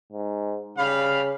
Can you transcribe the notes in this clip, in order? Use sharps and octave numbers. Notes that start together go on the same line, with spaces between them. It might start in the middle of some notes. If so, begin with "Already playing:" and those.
G#2
C#3 G3 F5 B5